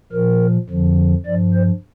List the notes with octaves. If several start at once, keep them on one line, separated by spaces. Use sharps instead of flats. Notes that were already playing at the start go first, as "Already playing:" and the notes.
A#2 F3 A#4
F2 D3 F3
G2 F3 D5
C5